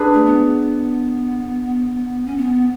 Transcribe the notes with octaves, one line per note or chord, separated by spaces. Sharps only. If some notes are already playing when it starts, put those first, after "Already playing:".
Already playing: D4 G#4 B4
A3
B3
C#4
B3